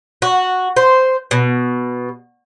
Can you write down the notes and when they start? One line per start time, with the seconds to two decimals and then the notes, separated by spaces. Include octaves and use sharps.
0.22 F#4
0.77 C5
1.31 B2